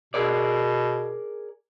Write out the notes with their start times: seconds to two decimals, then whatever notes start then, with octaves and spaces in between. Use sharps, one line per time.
0.14 B2 G#4 A#4 D5